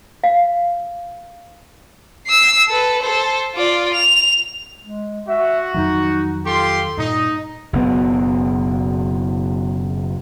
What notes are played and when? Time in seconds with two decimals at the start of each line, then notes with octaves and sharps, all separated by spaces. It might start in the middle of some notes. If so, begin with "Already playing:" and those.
0.24 F5
2.27 E6 C7
2.68 A4 B4
3.02 A4 C5
3.54 F4 D5
3.93 F7
4.82 G#3
5.27 F#4 E5
5.74 F2 D#3 F#3 D#4
6.45 F4 G4 A4 C6
6.97 G2 A#2 D#4
7.73 F#1 B2 B3